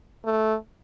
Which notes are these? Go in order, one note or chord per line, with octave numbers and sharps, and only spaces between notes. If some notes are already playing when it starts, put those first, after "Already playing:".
A3